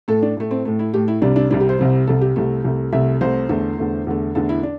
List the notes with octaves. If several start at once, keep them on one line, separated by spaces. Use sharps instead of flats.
A2 A3 A4
D4
A2 A3
C4
A2 A3
E4
A2 A3 G4
E4
C2 C3 G3 D4
D4
C2 C3 G3 D4
G4
C5
C2 C3 G3
C2 C3 G3 A4
G4
C2 C3 A3
C2 C3 A3
C2 C3 A3 E5
C2 C3 A3 C5
E2 D3 A3
E2 D3 A3
E2 D3 A3
E2 D3 A3 A4
E4
D4